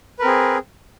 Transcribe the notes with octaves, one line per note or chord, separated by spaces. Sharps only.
C4 G#4 A#4 B4